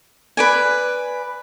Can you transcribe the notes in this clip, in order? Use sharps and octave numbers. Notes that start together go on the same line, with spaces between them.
B4 D5 G#5